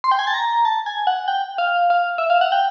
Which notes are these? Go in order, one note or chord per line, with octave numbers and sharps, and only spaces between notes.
C6
G5
G#5
A5
A#5
A5
G#5
F#5
G5
F5
F5
E5
F5
F#5
G5